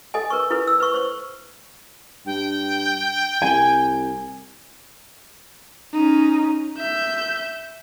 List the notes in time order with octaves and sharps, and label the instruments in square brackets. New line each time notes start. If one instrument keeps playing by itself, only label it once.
[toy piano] A4 D#5 G#5
A#4 B4 C#6
E4 A4 B4
E6
B4 C#6
B4 C5 C#6
[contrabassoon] G2 [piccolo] G5
[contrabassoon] C2 [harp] G#5
[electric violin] C#4 D#4
E5 G6